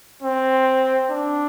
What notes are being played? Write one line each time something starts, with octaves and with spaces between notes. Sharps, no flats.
C4
D4